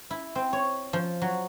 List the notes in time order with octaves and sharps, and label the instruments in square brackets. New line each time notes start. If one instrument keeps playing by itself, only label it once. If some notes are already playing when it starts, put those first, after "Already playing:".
[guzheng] E4
C4
C#5
F3
F#3